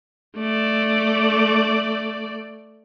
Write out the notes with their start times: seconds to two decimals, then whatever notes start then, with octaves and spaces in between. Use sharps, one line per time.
0.37 A3 D5